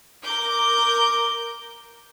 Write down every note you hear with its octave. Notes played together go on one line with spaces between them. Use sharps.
A#4 D6 G6